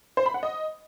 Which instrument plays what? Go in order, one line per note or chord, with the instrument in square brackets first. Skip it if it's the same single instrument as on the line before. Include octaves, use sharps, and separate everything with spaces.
[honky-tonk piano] C5
B5
F#5
D#5